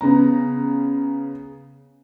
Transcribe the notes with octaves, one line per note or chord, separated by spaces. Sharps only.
C#3 B3 A#5